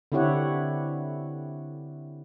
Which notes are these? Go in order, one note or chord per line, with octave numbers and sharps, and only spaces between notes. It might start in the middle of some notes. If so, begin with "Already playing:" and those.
D3 C4 E4 G4 C#5 F#5